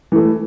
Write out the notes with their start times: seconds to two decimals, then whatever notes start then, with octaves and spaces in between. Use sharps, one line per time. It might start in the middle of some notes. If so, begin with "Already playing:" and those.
0.12 E3 A3